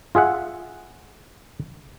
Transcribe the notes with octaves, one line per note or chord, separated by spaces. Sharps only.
F4 G#4 E5 F#5